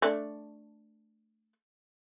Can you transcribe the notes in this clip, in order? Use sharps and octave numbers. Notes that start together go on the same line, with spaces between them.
A3 D4